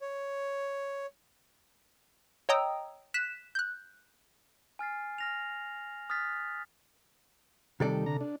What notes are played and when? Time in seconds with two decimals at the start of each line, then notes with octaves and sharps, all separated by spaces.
0.01 C#5
2.49 C#5 D#5 G5 A#5 D#6 E6
3.14 F#6 B6 E7
3.55 F#6 G6
4.79 G#5 F6 A6 C7
5.18 F6 A#6 F7
6.10 D#6 F6 F#6 A6 B6
7.80 C3 D#3 G3 A4 D5
8.06 D3 A#5
8.21 D4